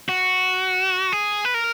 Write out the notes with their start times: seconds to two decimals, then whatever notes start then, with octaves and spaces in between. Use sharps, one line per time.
0.09 F#4
1.12 G#4
1.45 B4
1.54 A#4